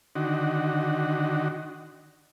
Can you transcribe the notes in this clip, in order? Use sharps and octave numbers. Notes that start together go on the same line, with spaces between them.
D3 D#3 F#4